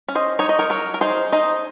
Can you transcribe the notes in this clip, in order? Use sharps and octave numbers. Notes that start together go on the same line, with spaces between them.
C#4
C5 D#5
D#4 C#5
D#5
A#4 C#5
F#3 A#4 C#5
A#4
D#4 G#4 C5
D#4 C5 D#5